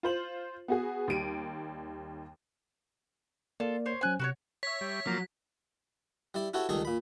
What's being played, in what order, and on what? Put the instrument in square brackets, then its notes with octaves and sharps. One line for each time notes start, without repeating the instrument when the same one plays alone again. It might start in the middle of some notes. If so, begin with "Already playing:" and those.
[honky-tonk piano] F4 C5 F#7
B3 F#4 G#4
D#2 G3 D7 D#7
[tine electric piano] A#3 A#4 D5 [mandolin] F4 A4
[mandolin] C5 C#5
[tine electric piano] F#3 C#4 C5 [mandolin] G#5 F#6
[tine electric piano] C3 [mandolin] F#4 B4 C#5
[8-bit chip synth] C#5 E5 [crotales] B6
[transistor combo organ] G3
[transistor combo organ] F3 A#3 [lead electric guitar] F#3
[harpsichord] G3 E4 D5
E4 F#4 G4 A4 C#5
C#2 D#3 G3 G#4 A4 C#6
A#2 B5